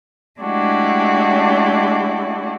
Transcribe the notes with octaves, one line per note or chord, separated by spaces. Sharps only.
G#3 A3 D4 E4 F#4 G4